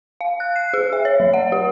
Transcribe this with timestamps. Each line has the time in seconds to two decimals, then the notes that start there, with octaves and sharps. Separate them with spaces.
0.21 F5
0.40 F#6
0.56 C7
0.74 G#4
0.93 E5
1.05 C#5
1.20 F#3
1.34 F#5
1.52 G4